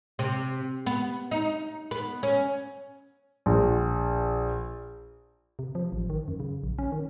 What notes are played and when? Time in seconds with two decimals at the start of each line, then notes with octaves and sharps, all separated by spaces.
0.19 C3
0.87 B3
1.31 D#4
1.91 B3
2.23 C#4
3.46 A#1
5.59 C3
5.75 F3
5.93 A1
6.10 D#3
6.28 F#2
6.40 C#3
6.64 A#1
6.78 C#4
6.92 D#3